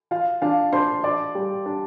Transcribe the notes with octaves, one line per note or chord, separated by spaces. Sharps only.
F4 F5
D4 F4 F5
D4 C5 C6
D4 D5 D6
G3
D4